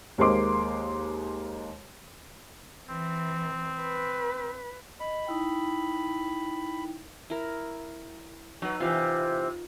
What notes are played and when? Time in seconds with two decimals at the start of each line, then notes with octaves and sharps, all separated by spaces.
0.18 D#2 G#3 A#3 C5 C6 D6
2.89 E3 C4
3.81 B4
5.00 D#5 B5
5.27 D#4 E4 G5
7.30 E4 A#4
8.62 F#3 D#4 B4
8.80 C3 E3 F4